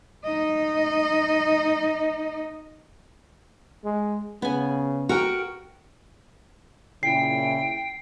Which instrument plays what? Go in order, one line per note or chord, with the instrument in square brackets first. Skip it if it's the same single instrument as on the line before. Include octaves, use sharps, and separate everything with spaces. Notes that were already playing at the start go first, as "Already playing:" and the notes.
[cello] D#4 D#5
[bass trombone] G#3
[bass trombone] C#3 [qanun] B3 G#5
[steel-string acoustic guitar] F#4 A#4 G5 [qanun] A#5
[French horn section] A#2 C#3 E4 [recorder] G5 [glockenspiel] C7